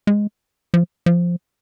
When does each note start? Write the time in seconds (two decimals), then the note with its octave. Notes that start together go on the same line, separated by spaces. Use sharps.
0.07 G#3
0.74 F3
1.06 F3